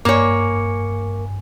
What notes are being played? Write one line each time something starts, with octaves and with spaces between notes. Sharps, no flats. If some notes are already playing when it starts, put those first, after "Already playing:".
G2 A#3 C#5 G#5